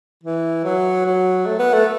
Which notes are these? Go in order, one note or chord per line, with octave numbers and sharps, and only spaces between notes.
E3
F#3
F#3
A3
B3
A3